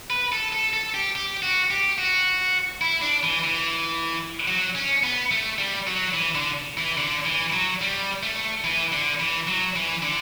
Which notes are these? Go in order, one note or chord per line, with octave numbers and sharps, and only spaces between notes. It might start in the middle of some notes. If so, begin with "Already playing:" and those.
B4
A4
A4
A4
G4
G4
F#4
G4
F#4
E4
D4
E3
E3
F#3
C#4
B3
A3
G3
F#3
E3
D3
E3
D3
E3
F#3
G3
A3
E3
D3
E3
F#3
E3
D3